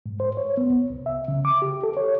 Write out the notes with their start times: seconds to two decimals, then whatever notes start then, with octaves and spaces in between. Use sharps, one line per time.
0.06 G#2
0.20 C5
0.37 C#5
0.57 B3
0.70 C2
0.90 C2
1.06 E5
1.28 C#3
1.45 D6
1.62 G4
1.83 A4
1.97 C#5